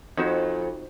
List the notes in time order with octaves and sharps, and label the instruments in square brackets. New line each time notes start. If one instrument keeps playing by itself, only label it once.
[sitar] F2 [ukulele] D#4 F#4 C5